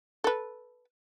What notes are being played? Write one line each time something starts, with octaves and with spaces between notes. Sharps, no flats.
A4 B4